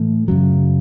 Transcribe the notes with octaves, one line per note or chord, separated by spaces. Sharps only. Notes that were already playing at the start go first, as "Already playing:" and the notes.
Already playing: A2 E3 A3
F#2 C#3 F#3